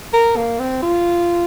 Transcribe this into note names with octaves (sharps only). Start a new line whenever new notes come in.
A#4
A#3
C4
F4